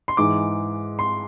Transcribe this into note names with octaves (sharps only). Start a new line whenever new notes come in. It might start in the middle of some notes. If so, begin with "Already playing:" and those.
C6
G#2 E3 G#3 D6
C6